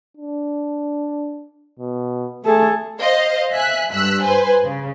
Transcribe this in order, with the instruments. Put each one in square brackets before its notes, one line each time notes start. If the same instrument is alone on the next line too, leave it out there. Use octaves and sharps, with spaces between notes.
[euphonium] D4
B2
[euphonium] A3 [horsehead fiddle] G#4 A4
[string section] C5 D#5 F5
E5 G#5 F#6 B6
G2 E6 F#6 B6
B4 C5 G#5
C#3